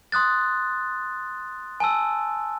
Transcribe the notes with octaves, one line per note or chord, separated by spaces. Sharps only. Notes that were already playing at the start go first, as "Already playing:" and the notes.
C6 D#6 F#6 A6
G#5 A5 E6